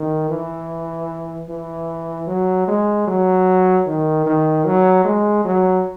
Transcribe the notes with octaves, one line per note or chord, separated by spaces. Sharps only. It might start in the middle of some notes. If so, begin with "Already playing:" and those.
Already playing: D#3
E3
E3
F#3
G#3
F#3
D#3
D#3
F#3
G#3
F#3